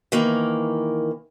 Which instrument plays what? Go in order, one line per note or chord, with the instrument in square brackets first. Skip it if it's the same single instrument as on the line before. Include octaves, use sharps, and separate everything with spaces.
[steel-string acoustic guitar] D#3 E3 A#3